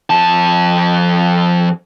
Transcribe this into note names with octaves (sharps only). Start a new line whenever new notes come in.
F2 A5